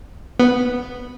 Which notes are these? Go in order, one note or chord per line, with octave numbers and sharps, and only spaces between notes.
B3